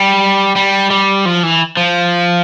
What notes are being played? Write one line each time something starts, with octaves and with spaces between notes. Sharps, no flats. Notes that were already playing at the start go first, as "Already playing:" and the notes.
Already playing: G3
G3
G3
F3
E3
F3